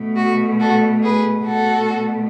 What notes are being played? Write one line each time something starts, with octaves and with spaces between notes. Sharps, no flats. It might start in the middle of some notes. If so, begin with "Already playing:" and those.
Already playing: B2 A3
F#4
F#4 A4
G#4 B4
B2 A3 F#4 A4